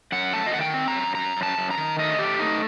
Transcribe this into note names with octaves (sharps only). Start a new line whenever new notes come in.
F#2 F#5
A3 A5
D#5
D#3 F#5
G5
C4
A#5
F#2
F#2 A#5
F#2
A5
F#2
A#5
D#3
A3 D#5
A3 G4
A3 D#4